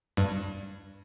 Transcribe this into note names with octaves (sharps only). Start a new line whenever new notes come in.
G2